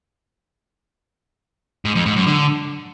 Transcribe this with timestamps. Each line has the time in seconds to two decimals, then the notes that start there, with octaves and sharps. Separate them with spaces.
1.85 G#2
1.95 F2
2.06 G#2
2.16 F#2
2.27 D3